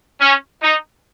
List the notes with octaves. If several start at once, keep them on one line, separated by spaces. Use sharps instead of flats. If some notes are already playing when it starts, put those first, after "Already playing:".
C#4
D#4